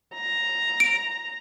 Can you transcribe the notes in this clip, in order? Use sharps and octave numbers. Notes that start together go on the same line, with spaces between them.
A#5
D7